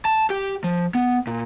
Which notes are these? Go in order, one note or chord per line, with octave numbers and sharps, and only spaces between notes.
A5
G4
F3
B3
A#2